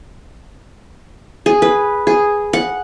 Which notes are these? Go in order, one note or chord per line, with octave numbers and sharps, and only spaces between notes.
G#4
B4
G#4
F#5